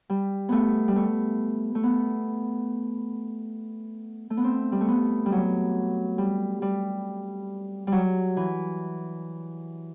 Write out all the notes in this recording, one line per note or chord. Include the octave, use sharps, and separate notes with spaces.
G3
A3 B3
G3
A3
A3
B3
A3
B3
C4
G3
A3
B3
G3
F#3
G3
G3
F#3 G3
E3